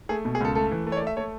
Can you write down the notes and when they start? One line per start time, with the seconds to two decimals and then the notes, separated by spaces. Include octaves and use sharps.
0.09 A3 G#4
0.25 B2
0.35 G#4
0.40 C#2 A4
0.55 A3 A4
0.71 E3
0.87 A3
0.92 C#5
0.97 D5
1.01 A3
1.07 E5
1.17 A3 C#5